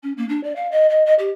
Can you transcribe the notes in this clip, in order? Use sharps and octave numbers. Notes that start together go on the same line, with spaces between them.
C#4
A#3
D4
D5
F5
D#5
D#5
D#5
G4